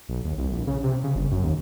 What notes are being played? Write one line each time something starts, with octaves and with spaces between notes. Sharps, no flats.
B1
D#2
C2
A#1
C#3
C3
C#3
G1
F#2
D#2